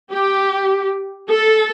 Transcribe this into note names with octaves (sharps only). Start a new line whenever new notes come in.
G4
A4